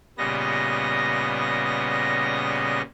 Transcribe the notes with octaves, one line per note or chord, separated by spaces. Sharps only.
A#2 C#3 G3 B3 D#5 A#6